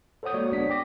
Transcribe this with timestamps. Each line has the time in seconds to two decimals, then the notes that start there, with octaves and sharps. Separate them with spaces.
0.23 A4 C5 C#5 F#5 D#6 G6
0.34 G#3 A#3 F#4 C#5 D5
0.52 G1 G#3 B3 D4 F#5 B6
0.70 G5 D6 A#6